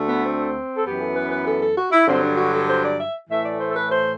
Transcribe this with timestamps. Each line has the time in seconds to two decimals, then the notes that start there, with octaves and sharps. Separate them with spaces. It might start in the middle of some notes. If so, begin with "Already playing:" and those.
Already playing: D2 D3 A3
0.08 B3
0.24 C4
0.76 A4
0.85 F#2 E3 B3 G4
1.00 A4
1.15 B4
1.31 B4
1.46 A4
1.61 A4
1.77 F#4
1.92 E4
2.07 G2 D3 F#3 C4
2.22 D4
2.37 F#4
2.53 A4
2.69 C5
2.84 D5
2.99 E5
3.30 A2 E3 A3 E5
3.44 D5
3.60 C5
3.69 A4
3.75 B4
3.90 C5